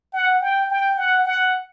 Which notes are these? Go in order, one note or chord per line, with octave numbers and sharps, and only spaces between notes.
F#5
G5
G5
F#5
F#5